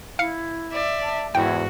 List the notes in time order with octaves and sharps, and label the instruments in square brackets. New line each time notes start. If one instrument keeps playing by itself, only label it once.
[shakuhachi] E4 [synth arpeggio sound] F5 C#7
[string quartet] D5 E5
[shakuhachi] A5
[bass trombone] E2 [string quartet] G#2 F#4 [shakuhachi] E4 [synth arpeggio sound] G5